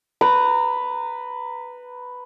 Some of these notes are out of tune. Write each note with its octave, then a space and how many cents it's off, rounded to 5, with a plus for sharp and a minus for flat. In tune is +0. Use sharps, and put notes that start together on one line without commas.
B4 +5 A#5 -20